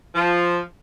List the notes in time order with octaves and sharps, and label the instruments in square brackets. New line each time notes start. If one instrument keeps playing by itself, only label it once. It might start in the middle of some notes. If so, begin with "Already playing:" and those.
[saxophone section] F3